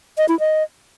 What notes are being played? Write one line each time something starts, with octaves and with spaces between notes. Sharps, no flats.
D#5
E4
D#5